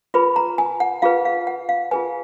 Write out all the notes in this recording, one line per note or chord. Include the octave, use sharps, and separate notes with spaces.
F4 G#4 B4 B5
A#5
G#5
F#5
F4 G#4 B4 F5
F5
F#5
F5
F4 G#4 B4 G#5